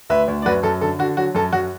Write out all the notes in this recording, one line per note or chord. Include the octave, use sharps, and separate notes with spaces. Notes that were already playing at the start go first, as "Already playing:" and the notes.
D2 B4 E5
D2
D5
F#2 F#4 B4
F#2 A4
D3 A4
D3 F#4
F#3 F#4
F#2 A4
F#2 F#4